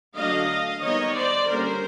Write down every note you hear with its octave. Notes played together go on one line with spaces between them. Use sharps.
D3 F#3 A3 D4 D#5 F5
D#3 G3 B3 D#4 C#5 D#5
C5 D5
D3 G3 A#3 C#4 A#4 C5